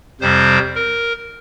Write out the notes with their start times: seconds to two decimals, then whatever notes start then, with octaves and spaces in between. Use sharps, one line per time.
0.21 F2 C3 G3 C4 C5
0.75 A#4